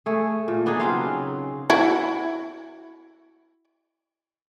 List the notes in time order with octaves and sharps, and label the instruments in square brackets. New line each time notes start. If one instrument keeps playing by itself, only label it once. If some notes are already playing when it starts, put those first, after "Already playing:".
[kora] A3 G#4
A#2
B3 D4 D#4 G#4
C#3 F#3 C4 F5
[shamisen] E4 F#4